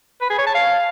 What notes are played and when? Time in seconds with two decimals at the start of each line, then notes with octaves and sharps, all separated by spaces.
0.22 B4
0.30 G#4
0.38 C#5
0.47 A5
0.55 F5